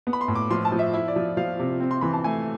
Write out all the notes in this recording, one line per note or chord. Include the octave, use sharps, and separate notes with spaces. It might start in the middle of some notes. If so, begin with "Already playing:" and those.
B3
B5
C6
A2
D6
F3 C6
A5
F3
E5
E4
D5
F3
F3 F5
C3
C4
C6
E3 B5
A5
A3 G#5